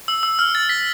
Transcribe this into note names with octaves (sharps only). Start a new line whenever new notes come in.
E6
E6
F6
A6
B6